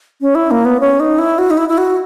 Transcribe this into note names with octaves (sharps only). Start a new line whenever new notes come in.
C#4
E4
A#3
B3
C#4
D#4
E4
F#4
D#4
E4
E4
F#4